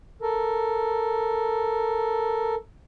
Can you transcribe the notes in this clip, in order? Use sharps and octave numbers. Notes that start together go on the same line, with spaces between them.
A4 A#4